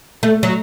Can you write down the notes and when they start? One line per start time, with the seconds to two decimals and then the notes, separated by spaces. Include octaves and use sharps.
0.23 A3
0.43 F#3